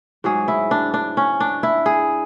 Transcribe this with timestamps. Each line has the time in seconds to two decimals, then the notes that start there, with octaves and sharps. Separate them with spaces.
0.24 G#2 F#3 G#4
0.48 E4
0.71 D4
0.94 D4
1.17 C#4
1.40 D4
1.63 E4
1.86 G#4